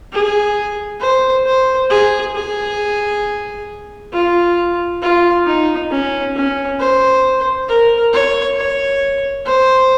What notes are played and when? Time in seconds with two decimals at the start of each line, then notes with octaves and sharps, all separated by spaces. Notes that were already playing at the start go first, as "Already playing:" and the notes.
0.12 G#4
1.00 C5
1.46 C5
1.90 G#4
2.35 G#4
4.13 F4
5.02 F4
5.45 D#4
5.91 C#4
6.35 C#4
6.80 C5
7.69 A#4
8.13 C#5
8.57 C#5
9.46 C5